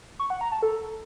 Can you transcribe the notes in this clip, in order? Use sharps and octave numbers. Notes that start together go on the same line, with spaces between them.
C#6
F#5
A#5
A5
A4